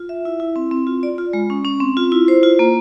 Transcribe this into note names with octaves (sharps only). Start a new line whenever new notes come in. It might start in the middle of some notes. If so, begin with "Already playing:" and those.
Already playing: F4
E5
E4
E4
C4
C4
F4
D5
F4
G#3
C#4
C#4
C4
F4
E4
C5
F4
A#3